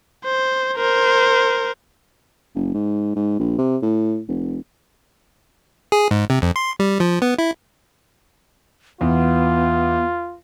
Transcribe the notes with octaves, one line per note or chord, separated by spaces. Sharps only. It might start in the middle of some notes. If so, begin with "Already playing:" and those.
C5
A#4 C5
F#1
G#2
G#2
A#1
C3
A2
F1
G#4
G#2
C3
F2
C6
G3
F3
B3
E4
E2 B3 F4